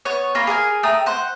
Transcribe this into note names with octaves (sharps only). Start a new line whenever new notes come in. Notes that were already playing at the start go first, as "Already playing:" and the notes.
B3 C#5
A#3 F4 A#5 B5
G#4 A#4 F#5 G#5
A3 G5 A#5 D#6
C5 F#5